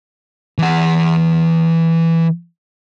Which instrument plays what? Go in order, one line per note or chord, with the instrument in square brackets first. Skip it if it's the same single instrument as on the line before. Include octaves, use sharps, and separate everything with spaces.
[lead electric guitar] E3 F#5